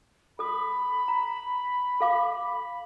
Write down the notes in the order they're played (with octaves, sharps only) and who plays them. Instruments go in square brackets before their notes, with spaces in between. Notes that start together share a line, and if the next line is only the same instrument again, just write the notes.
[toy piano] A4 D#6 [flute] B5
[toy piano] A#5
A4 F5 D6